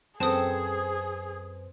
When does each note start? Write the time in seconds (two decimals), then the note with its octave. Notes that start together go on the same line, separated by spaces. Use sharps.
0.20 F#2 C4 G#4 A4 B4 C5 A5 D#6